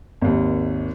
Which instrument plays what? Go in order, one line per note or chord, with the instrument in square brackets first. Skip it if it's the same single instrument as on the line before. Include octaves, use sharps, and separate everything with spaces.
[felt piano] G#1 D#2